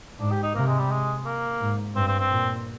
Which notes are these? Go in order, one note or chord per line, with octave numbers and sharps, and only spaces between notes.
G#2 D4
G4
D#4
C3 A#3
G#3
G3
G#3
A#3
G#2
G2 C4
C4
C4
A#2